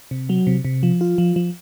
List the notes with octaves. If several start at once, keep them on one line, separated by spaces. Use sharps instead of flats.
C3
F#3
C3
C3
F3
F4
F3
F3